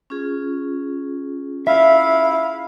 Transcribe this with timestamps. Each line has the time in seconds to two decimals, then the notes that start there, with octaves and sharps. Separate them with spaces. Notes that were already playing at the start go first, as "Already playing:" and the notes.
0.10 C#4 F4 G#4
1.67 E4 E5 F5